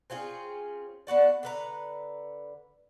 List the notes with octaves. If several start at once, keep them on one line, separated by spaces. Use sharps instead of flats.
C4 C#4 F4 G#4
B3 D4 F#4 D5
D3 B4 A#5